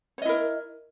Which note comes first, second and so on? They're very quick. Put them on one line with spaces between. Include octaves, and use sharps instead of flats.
C#5 D#5 E4 A#4